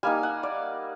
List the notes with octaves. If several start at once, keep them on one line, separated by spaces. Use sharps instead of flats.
G3 A#3 D#4 G#5
F#5
D5